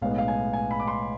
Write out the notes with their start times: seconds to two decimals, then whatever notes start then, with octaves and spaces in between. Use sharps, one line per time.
0.02 B1 A2 G#3 B3 F5
0.18 F5
0.28 G#5
0.53 G#5
0.71 B5
0.80 D6
0.87 C6